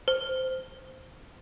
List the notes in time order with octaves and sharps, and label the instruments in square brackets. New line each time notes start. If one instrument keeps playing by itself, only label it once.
[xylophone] C5